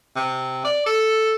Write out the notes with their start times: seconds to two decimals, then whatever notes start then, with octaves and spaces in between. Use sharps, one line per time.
0.16 C3
0.65 D5
0.86 A4